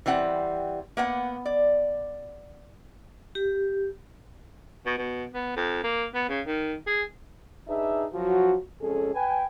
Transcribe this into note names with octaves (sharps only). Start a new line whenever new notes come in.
E3 G3 C4 F#5
A#3 B3 F#5
D5
G4
B2
B2
B3
F2
A#3
B3
C#3
D#3
G#4
D4 D#4 G#4 B4 E5
F#2 F3 F#3 F#4
F2 G#3 C#4 G#4 A4
B4 G5 G#5